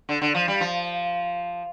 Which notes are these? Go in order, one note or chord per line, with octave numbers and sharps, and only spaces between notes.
D3
D3
F3
G3
F3